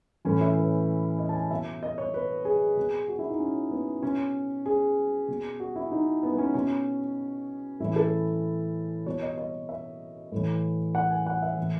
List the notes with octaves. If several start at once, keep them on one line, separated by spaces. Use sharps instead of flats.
A2 E3 C#4
E4
B4
D#5
A5
G#5
B2 E5
D#5
C#5
B4
G#4
B2
F#4
E4
D#4
C#4
B3
B2 C#4
G#4
B2
F#4
E4
D#4
B3
B3
C#4
B2 C#4
A2 E3 E4
A4
B2 C#5
D#5
D#5
E5
A2 E3
F#5
G#5
F#5
E5
A2 E3